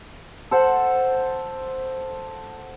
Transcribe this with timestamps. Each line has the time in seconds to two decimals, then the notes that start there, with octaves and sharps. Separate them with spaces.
0.51 A4 C5 F#5